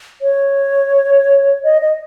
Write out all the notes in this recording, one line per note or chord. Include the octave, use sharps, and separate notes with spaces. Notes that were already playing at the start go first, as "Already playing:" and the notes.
C#5
D#5
D#5